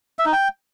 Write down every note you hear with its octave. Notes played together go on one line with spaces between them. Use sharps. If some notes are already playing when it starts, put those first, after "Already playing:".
E5
D#4
G5